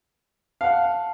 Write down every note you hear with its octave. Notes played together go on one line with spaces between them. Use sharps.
F5 F#5 A5